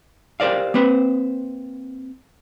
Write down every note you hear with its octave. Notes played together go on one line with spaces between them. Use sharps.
G4 A#4 C5 D5 F5
A#3 C4 B4 C5